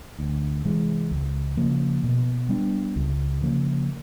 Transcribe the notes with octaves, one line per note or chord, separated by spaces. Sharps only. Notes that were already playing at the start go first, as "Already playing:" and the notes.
D2
C3 E3 G#3
C#2
C#3 F3 A#3
B2
G3 B3 D4
C#2
C#3 F3 A#3